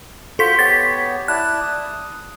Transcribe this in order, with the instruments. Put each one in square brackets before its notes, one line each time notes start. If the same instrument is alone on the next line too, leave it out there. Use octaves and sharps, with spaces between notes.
[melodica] F4 F#4 C5 [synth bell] A4 B6
[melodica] B3 G4 C#5 [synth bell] A6 B6
[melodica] E4 D5 A5 [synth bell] F#6
[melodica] D#6